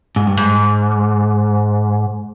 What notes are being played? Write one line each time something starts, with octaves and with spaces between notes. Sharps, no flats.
G#2
G2
G#2